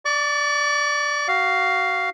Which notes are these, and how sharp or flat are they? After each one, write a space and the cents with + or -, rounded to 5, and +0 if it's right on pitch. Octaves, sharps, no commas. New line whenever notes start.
D5 +0 C#6 +45
F#4 +20 F5 +0